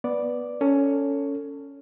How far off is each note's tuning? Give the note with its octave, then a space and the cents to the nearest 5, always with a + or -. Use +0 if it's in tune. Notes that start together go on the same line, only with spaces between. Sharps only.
B3 -5 D5 +0
C#4 +10 A4 +25